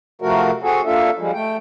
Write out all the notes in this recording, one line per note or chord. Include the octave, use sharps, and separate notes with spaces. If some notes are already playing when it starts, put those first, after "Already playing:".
C3 F3 A3 F#4 A#4
C4 F#4 G#4 A4
A#3 D4 F4 A4 E5
F3 G3 G#3
A3 G5